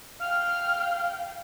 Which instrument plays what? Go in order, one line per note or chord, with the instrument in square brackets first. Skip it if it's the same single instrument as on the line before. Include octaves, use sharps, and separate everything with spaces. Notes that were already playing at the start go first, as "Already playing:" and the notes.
[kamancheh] F5 G5 [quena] F6